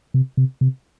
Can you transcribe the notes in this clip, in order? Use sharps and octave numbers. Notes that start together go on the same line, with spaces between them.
C3
C3
C3